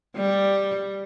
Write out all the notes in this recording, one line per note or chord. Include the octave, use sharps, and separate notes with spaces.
G3